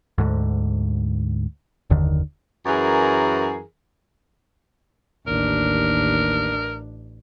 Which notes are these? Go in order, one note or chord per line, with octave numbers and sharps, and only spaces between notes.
D2 G#2 D3
F#1 D#2 D3 D#3
F#2 E3 G#4 A#4
A1 D#2 D4 A#4